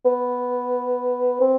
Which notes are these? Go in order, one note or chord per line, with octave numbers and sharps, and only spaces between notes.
B3
C4